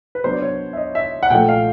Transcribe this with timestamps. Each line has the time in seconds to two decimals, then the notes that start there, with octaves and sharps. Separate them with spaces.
0.15 B4
0.24 F#3 B3 D4 C5
0.33 D5
0.42 C#5
0.73 E5
0.77 D#5
0.95 E5
1.23 F#5
1.30 A#2 F3 A3 G5
1.49 F5